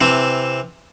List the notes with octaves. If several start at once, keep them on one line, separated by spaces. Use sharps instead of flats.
C3 E3 C4